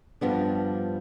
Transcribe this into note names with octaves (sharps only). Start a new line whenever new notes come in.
G2 F3 B3 D4